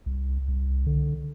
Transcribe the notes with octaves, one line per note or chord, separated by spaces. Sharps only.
C2
C2
D3